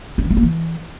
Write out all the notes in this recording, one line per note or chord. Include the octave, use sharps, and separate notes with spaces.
C#4
E3
A3
A#3
E3